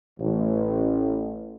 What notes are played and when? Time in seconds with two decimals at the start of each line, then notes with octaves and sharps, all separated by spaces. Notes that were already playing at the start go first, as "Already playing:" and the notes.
0.19 A1